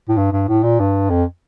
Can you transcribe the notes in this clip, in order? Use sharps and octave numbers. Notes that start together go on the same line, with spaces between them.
A2
G2
G2
A2
A#2
G2
F2